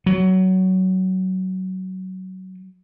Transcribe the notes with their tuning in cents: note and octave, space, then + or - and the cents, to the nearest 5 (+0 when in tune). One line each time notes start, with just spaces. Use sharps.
F#3 +15